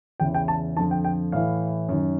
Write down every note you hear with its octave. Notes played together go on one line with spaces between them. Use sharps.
E2 C#3 E3 G5
G5
A5
F2 D3 A5
G5
G5
A2 E3 F5
F#2 D#3